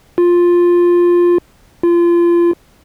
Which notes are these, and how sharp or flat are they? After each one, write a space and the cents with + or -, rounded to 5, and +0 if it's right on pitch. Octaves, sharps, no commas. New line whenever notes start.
F4 +5
F4 -25